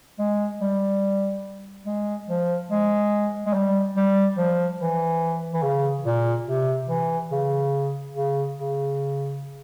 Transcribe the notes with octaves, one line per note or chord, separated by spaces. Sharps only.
G#3
G3
G#3
F3
G#3
G#3
G3
G3
F3
E3
E3
C#3
A#2
C3
E3
C#3
C#3
C#3